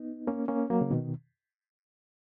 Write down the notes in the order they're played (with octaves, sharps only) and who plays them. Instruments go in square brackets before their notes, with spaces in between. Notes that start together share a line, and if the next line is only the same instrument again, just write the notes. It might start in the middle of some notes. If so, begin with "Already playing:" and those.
Already playing: [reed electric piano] B3 D#4
A#3 C#4
A#3 C#4
F#3 A#3
C#3
B2 D#3